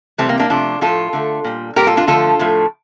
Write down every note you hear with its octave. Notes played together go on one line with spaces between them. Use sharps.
C3 E3 G3 A3 C4
A#3
A#3 D4
C3 F3 A3 D4 F4
A2 F3 A3 F4 A4
D3 A3
A#2 G3
A#2 G3 G4 A#4
F4 A4
D4 F4
D3 F3 A3 F4 A4
A2 F3 A3